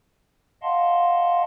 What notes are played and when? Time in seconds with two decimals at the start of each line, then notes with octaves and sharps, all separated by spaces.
0.63 D#5 F5 F#5 A5 C6